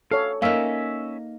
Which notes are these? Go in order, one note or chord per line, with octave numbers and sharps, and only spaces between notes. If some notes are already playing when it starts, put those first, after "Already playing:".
A4 C#5 F5
A#3 C#4 D#4 E5 F5